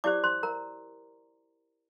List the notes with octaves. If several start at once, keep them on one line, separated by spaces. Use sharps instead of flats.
E4 G4 C5 D5 D6
C5 C6
A#4 A#5